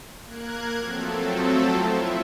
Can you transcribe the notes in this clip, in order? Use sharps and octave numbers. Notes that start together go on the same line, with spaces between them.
A#3 A#4 F#6 G#6
F3 F#3 A3 C4 A4
E4 F4 E5